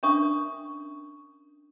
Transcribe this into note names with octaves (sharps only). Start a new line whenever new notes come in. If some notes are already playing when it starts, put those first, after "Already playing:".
C#4 D4 A#4 E5 C#6 D#6